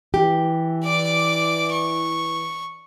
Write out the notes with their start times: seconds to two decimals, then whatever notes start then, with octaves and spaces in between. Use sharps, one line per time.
0.14 E3 G4
0.84 D5 D6
1.72 C#6